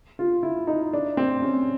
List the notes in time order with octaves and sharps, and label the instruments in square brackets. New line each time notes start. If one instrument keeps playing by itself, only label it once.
[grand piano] F4
E4
D#4
D4
C4
C#4